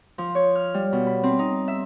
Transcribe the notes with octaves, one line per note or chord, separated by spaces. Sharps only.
F3
C#5
F6
G3
B2
B5
C4
D#4
E5